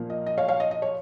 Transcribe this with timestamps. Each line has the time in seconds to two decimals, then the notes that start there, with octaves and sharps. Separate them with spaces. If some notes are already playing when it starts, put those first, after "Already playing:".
Already playing: A#2 F3 A#3
0.10 D#5
0.26 D#5
0.38 C#5 F5
0.48 C#5 F5
0.60 D#5
0.71 D#5
0.82 C#5